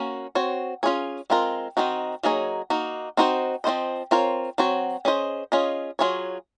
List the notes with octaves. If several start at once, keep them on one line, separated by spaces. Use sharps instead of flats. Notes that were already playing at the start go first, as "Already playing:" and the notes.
Already playing: A#3 C#4 F#4
C4 F#4 C#5
C#4 F4 G#4 C#5
G#3 C4 F4 A#4
D#3 F#3 C4 D#4 F#4
F#3 A#3 D#4 G#4 C#5
A#3 D#4 F#4
C4 D#4 F#4 C5
F3 C4 F#4 C5 D#5
C4 F4 A#4 C#5
F#3 C4 F#4 C#5
C#4 G#4 C5 D#5
C#4 F4 G#4 D#5
F#3 C#4 F4 G#4 C#5